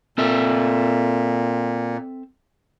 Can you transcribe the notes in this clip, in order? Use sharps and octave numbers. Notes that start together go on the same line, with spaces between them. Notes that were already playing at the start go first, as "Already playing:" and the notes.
A#2 C4 A4 E5